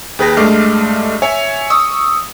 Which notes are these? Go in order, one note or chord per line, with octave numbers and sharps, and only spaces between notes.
D#2 G#4 B4 G5 A#6
G2 G#3 A3 D6 F6 C7
C#5 E5 G#5
C#6 D#6 E6